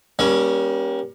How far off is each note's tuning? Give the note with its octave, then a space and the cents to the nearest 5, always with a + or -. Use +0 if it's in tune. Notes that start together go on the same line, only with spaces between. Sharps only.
G3 +0 A#3 +35 C#4 +5